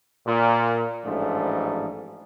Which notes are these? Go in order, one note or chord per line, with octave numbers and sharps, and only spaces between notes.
A#2
A1 G#2 F3 A3 D4